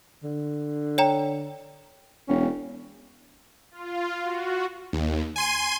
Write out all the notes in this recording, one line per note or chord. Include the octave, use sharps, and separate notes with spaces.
D3
C#5 G5 A#5
E1 C#4
F4
F#4
D#2
G#5 C6 D#7